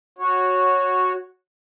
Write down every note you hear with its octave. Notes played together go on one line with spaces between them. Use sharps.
F#4 C#5